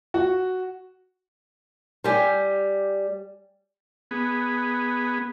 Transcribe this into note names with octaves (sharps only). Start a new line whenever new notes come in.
F#4
G3 G4 G#5
B3 G#4